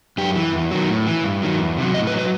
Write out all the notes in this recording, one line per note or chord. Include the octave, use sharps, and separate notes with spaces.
F#2 G4
E3
E2
D#3 F#3
A2
E3
G2
D#3 F#3
E2
C3 F#3
A2 D#5
B4
F#3
B4